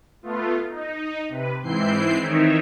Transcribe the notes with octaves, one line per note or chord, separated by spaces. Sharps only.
A3 B3 F4
D#4
C3 B4
G#2 E3 C4 E4 G6 C7
D#3 E3 C4 D#4 C#5 E5